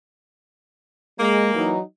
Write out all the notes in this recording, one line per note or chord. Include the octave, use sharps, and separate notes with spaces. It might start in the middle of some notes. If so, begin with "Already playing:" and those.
G#3 A#3
E3 F#3 D#4